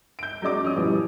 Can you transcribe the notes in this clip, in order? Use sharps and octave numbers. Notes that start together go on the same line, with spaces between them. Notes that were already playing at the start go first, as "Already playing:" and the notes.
G6 D7
F#3 G#3 C#4 D5 D6 D7
F3 C#4 D#6
B2 E3 F3 G3